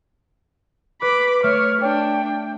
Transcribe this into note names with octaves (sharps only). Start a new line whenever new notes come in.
B4 B5 D6
A3 C#5 F6
D4 G5